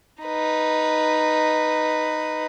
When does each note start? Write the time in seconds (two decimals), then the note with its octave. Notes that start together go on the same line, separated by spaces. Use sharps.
0.23 D#4 B4